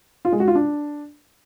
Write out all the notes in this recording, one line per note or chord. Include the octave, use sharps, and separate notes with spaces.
F4
G#3
F#4
F4
D4